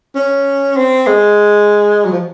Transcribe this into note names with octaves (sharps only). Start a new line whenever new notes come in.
C#4
C4
G#3
F#3
F3